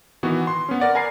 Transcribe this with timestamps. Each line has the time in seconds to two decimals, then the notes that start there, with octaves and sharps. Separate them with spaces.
0.23 D#3 E3 B3 F#4
0.47 C6
0.69 B3 C#4
0.80 A#4 D5 F#5
0.95 A#4 G#5 B5 C7